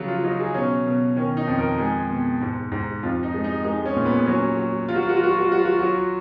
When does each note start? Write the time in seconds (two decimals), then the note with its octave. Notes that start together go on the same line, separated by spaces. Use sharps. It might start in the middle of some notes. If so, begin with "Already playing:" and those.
Already playing: C#3 F3 F#3
0.08 F4
0.24 F#3 D#4
0.39 G#4
0.54 B2 C#4
0.86 B2
1.16 D#3 C#4
1.37 D#4
1.47 F2
1.58 A#4
1.78 G#3 G#4
2.09 B2
2.41 G#2
2.72 G#2
3.03 F2 F4
3.23 D#4
3.34 G#3
3.44 D#4
3.64 G#3 D#4
3.86 C#4
3.96 A#2
4.06 B3
4.26 F#3 C#4
4.57 F#3
4.89 F#3 F4
4.95 F#4
5.03 F4
5.09 F#4
5.17 F4
5.20 F#3 F#4
5.31 F4
5.38 F#4
5.45 F4
5.51 F#3 F#4
5.59 F4
5.65 F#4
5.72 F4
5.79 F#3 F#4
5.87 F4